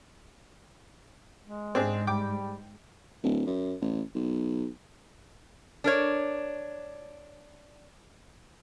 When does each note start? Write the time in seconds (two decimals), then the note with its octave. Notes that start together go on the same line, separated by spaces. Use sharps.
1.44 G#3
1.75 G#2 C4 D4 G#4
2.07 G3 G5 D6
3.23 D1
3.46 F#2
3.82 A1
4.15 B1
5.84 D4 A#4 C#5